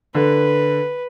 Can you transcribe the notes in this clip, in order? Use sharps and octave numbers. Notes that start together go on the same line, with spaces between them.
D3 B4